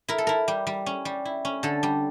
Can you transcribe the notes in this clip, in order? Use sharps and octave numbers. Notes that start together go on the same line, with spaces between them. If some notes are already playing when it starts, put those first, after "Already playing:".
E4 A#4
A4
E4 A#4
G3
G3
C#4
G3
E4
C#4
D3 A4
G3